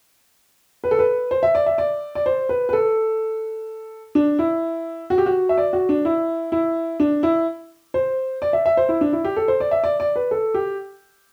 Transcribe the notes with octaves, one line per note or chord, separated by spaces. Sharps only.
B4
A4
B4
C5
E5
D5
E5
D5
D5
C5
B4
B4
A4
D4
E4
F#4
G4
F#4
E5
D5
F#4
D4
E4
E4
D4
E4
C5
D5
E5
E5
C5
E4
D4
E4
G4
A4
C5
D5
E5
D5
D5
B4
A4
G4